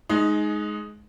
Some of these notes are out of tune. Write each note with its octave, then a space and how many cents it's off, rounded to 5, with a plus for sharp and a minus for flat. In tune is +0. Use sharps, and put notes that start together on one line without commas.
G#3 +20 D#4 +0